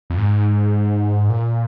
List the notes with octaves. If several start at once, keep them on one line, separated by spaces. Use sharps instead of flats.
F2
G#2
A#2